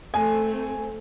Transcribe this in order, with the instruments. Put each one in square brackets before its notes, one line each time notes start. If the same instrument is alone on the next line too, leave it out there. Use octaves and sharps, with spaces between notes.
[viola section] A3 C4 [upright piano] G#5